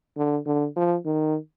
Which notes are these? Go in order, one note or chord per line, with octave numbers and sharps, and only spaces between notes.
D3
D3
F3
D#3